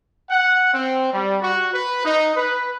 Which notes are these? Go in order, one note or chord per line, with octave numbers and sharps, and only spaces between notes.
F#5
C4
G3
F#4
B4
D#4
B4